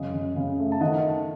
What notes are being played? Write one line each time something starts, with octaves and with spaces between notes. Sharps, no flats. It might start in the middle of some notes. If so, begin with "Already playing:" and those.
Already playing: F#2 C#3 D#5
C#3
C#3
A3
A5
D#3 D#5 F#5